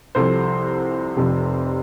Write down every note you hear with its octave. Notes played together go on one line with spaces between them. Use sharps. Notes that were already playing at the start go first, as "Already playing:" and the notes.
C2 C3 F3 A4 C5
F1 F2 C3